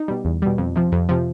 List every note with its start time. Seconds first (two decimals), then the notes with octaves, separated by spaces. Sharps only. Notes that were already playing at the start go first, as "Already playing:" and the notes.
Already playing: D#4
0.08 B2 G3
0.25 E2
0.42 B2 G3
0.58 F2
0.76 C3 F3
0.92 F2
1.09 C3 F3